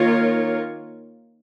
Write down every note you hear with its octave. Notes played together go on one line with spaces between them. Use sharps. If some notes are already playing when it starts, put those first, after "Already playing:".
Already playing: D#3 A#3 F4 A#4 C#5